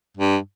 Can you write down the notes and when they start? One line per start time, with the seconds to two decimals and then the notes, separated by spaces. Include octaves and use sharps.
0.17 G2